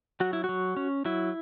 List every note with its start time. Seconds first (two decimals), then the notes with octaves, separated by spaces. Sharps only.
0.20 F#3 F#4
0.33 E4
0.44 F#3 F#4
0.77 C#4
1.05 F#3 E4